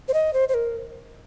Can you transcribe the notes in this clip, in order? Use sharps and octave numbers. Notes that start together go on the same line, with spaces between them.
C5
D#5
C5
C5
A#4